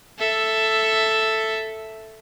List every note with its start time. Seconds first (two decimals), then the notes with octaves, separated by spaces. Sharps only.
0.19 A4 E5